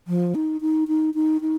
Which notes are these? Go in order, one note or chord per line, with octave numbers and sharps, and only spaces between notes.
F3
D#4
D#4
D#4
D#4
D#4